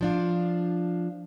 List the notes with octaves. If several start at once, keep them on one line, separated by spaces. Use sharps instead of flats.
F3 D4 F4